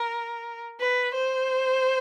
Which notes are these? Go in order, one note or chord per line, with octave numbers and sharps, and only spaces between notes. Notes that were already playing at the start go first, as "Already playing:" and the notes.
Already playing: A#4
B4
C5